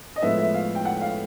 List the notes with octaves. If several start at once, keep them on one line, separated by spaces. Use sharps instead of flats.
D#5
A2 F3 G#3 B3 E5
E5
F5
G5
F#5
F5